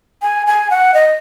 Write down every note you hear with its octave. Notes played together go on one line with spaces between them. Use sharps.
G#5
G#5
F#5
D#5